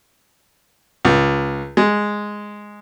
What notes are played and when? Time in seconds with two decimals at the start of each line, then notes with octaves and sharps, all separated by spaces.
1.05 C#2
1.77 G#3